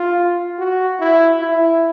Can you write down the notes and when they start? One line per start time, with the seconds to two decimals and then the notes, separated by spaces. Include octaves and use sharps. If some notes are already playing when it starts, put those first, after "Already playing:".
Already playing: F4
0.59 F#4
1.00 E4
1.41 E4